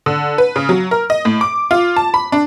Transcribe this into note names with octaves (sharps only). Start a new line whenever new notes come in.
D3
B4
C#3
F#3
A#4
D#5
A2
D6
F4
A5
B5
D4